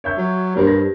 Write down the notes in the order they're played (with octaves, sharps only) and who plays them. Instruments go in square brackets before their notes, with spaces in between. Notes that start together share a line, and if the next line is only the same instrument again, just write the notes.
[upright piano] C#5 E5 G6
[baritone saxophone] F#3
[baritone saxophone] G2 [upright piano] A#3 A#4 C5
[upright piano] A#6